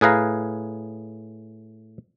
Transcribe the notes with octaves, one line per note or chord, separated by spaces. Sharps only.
A2 G#4 B4 F5 A#5